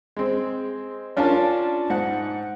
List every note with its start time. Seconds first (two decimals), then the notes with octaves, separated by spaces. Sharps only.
0.17 G#3 C4
1.17 C#4 D4 F4 A#4 D5 A5
1.90 G#2 F#5